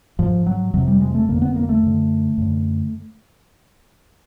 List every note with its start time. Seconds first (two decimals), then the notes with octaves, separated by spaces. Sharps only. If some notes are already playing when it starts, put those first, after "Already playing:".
0.19 G#2 F3
0.47 F#3
0.74 F2 C3 F#3
0.88 G3
1.01 G#3
1.15 A3
1.29 F2 D3 A#3
1.42 B3
1.56 A#3
1.69 A3
1.83 F#2 D3
2.37 F#2 D3